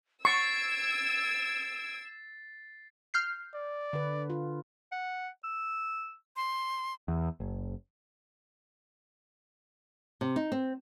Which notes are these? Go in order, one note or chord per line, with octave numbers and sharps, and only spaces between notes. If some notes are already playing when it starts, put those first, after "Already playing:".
C#6 E6 G#6 A6 C7 D7
F6 G6 C7
D5
D3 B4
F4
F#5
E6
C6
E2
F#1
C3
D#4
C4